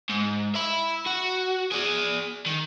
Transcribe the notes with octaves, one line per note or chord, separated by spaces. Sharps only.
G#2
E5 B5
F#4
G#4 D5
D#3